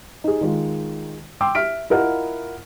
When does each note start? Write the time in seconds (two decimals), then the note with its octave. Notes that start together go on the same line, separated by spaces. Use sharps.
0.24 D#4 G#4
0.41 D#3 G#3 F4
1.41 G5 C6 D6 E6
1.55 E5 F6 B6 D7
1.90 E4 F4 A#4 D#5 F#5